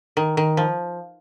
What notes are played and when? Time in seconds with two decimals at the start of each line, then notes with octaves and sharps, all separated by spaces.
0.17 D#3
0.37 D#3
0.57 F3